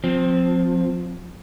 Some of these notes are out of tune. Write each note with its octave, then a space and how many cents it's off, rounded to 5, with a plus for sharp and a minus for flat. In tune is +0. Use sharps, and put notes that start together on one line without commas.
F3 +25 C4 +0